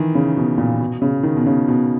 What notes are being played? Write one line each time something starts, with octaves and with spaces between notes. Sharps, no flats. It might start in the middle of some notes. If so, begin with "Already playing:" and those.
Already playing: D#3 E3
C#3
B2
A#2
B2
C#3
D#3
B2
C#3
B2